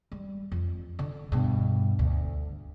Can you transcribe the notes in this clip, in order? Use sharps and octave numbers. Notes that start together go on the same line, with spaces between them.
G3
F2
D3
G2 B2
D2